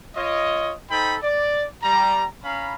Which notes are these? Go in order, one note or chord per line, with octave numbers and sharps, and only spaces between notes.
F4 C#5 D#5
D#4 A4 C5 G5 B5
D5
G3 A#5
C#4 F5 A#5 B5